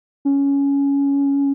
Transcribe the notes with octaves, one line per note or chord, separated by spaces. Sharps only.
C#4